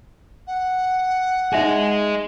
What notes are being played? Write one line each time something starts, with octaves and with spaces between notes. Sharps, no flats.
F#5
D#4 G#4 D#5 E5 G#5